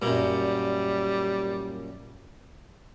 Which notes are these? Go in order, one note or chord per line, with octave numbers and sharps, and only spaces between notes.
F#2 A#2 G3